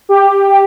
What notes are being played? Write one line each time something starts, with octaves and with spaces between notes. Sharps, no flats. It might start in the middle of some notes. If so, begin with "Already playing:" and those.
G4